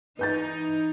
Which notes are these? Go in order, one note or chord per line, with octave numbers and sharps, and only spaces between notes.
E3 D#4 B4 G6 A6